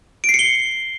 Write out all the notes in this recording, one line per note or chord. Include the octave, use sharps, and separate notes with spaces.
D7
C7
C#7
G7